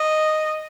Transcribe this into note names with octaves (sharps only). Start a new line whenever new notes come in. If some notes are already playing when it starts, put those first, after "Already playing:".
Already playing: D#5